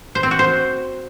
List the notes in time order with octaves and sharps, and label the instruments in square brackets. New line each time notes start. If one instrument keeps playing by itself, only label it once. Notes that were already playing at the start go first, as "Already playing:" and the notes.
[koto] C5
C4
F#4
C5